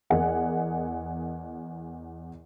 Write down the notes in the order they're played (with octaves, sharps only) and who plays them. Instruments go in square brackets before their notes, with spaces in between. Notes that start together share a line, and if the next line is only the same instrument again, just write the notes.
[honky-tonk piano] E2 G#4 A#4 D#5 F#5 G#5